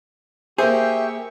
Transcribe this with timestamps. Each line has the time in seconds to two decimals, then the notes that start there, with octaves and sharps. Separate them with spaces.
0.58 A#3 G4 G#4 C5 E5 G5 C#6